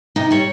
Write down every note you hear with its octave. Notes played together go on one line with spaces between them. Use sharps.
C3 D#4
G3 C#5